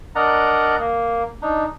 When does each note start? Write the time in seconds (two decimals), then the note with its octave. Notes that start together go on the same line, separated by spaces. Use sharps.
0.15 D4 A#4 D5 D#5 F#5 A#5
0.79 A#3
1.42 D4 D#4